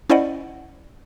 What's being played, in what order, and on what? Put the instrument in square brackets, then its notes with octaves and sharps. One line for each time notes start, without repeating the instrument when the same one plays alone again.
[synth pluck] C#4 E4 C5 D5 D#5 F#5